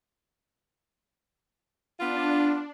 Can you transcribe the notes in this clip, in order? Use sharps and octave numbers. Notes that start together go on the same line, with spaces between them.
B3 D4 F4